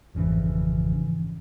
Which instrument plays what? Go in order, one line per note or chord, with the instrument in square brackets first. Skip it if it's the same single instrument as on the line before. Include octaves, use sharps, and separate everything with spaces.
[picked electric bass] G#1 F2 C#3 E3